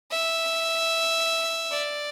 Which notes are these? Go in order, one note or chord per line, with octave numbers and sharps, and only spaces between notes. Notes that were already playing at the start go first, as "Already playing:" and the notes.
E5
D5